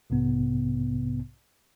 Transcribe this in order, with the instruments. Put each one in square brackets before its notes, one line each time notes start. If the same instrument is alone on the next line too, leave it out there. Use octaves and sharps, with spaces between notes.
[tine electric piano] B1 G#2 C3 B3